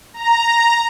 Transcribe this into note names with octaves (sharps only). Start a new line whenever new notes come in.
A#5